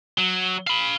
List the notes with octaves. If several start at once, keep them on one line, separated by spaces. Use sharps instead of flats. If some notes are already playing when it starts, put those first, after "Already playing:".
F#3
F5 B5